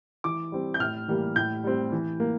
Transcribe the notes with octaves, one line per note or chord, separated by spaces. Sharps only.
E3 D6
G3 C4
G6
A2 F6
E3 G3 A#3
A2 G6
G3 C4
E3
A#3